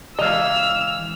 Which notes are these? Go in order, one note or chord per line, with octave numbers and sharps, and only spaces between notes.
C#2 E3 D#5 F5 E6 F7